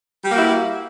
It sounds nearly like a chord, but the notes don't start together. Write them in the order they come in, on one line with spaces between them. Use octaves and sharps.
G3 G4 A#3 F#4 E4